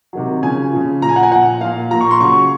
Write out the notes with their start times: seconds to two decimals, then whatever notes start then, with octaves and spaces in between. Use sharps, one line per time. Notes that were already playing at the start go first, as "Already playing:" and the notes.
0.13 C3 D#3 F#3
0.42 C#3 F3 G#5
0.73 C#3 F3
1.01 A#2 F3 A#5
1.09 G#5
1.16 F#5
1.23 G#5
1.31 A#2 F3 F#5
1.61 A#2 F3 F5
1.91 F3 A#5
1.95 A#2
2.01 C#6
2.11 C6
2.20 C#3 F#3 C#6